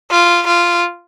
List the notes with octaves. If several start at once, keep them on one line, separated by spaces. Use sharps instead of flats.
F4
F4